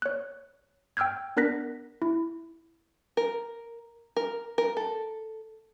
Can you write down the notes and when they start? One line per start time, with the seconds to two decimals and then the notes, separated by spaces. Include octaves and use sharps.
0.02 C#5 F#6
0.97 G5 E6 F6 G6 G#6
1.37 B3 D4 A#4 F#6 A#6 B6
2.02 E4
3.17 A#4
4.16 A#4
4.58 A#4
4.77 A4